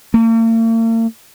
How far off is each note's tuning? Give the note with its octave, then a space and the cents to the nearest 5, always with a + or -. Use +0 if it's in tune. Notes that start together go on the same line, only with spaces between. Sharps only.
A#3 -45